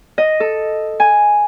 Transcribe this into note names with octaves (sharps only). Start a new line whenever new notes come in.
D#5
A4
G#5